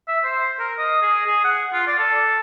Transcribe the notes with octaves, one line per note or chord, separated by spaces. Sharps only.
E5
C5
A#4
D#5
G#4
G#4
F#5
F4
D5
A4